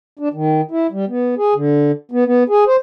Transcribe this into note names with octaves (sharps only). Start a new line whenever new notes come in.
D4
D#3
E4
G3
B3
G#4
D3
B3
B3
G#4
C5